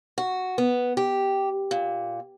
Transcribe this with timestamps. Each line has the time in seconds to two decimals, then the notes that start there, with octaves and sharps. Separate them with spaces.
0.18 F#4
0.58 B3
0.97 G4
1.71 A#2